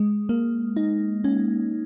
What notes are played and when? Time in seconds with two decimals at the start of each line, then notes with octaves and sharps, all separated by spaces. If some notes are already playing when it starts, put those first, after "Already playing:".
Already playing: G#3
0.29 A#3
0.76 D#4
1.24 C#4